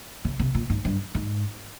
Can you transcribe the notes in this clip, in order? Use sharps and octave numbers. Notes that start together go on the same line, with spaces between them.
C#3
C3
A#2
G#2
G2
G#2